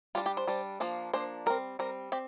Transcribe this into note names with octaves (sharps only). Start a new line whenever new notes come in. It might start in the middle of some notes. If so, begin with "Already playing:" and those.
G3 D4 F4
G4
C5
G3 D4
F3 A#3 D4
F3 A#3 D4 C5
G3 C4 A#4
G3 C4 A#4
C4 G4